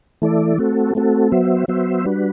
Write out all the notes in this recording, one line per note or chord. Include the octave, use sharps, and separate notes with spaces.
E3 A3 E4 A4 D5
A3 C4 F#4 A4
A3 C4 F#4 A4
F#3 B3 F#4 C5 E5
F#3 B3 F#4 C5 E5
G3 D4 F#4 B4